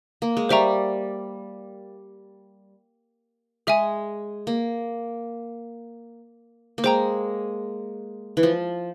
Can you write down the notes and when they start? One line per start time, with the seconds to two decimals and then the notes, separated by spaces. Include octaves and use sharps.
0.22 A#3
0.37 G#3
0.49 G3 C5 E5 G5 A#5 C#6
3.67 G#3 G#4 E5 G#5
4.47 A#3
6.78 A#3
6.84 G#3 C5 G5 A#5
8.37 E3
8.43 F3